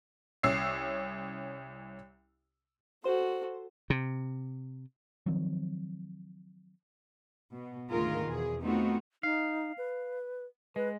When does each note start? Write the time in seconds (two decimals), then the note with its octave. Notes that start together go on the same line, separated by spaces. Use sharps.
0.43 C2 C#4 E6 C7
3.04 F#4 A4 C5 C6
3.90 C3
5.26 D#3 F3 F#3 C4
7.53 B2
7.89 D2 G#2 D#3 F4 G#4 A#4
8.25 E2 B2 G#4
8.62 A3 B3 C4 D#4 F4 F#4
9.23 D#4 F5
9.78 B4
10.76 G#3 B4